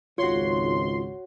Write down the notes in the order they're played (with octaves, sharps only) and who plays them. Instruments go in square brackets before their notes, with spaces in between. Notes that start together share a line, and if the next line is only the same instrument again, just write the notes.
[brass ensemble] G#1 C#2 G#2 [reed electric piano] F4 [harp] F#4 C#5 [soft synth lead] C6